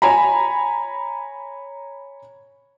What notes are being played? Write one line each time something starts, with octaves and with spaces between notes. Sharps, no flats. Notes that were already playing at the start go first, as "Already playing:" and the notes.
C#5 G#5 A#5 B5